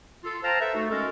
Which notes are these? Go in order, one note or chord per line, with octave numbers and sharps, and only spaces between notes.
F4 A4
C5 F5 G5 A5 A#5
A4 B4 C5 E5
A3 D#4 F#4 A4
G#3 C#4 F#4 A4 A#4